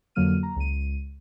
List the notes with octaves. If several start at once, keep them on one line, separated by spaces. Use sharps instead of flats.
F2 D3 F#3 A#3 F6 D#7
A#5
C#2 D#7